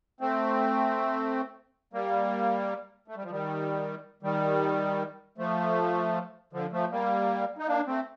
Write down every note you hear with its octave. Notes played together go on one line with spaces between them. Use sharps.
A3 C4
G3 A#3
A3
G3
F3
D#3 G3
D#3 G3
F3 A3
D3 F3
F3 A3
G3 A#3
D#4
A#3 D4
A3 C4